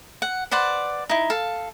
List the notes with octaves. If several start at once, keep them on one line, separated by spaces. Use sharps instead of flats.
F#5
B4 C5 D5 F#5
D#4 E4
A4 F5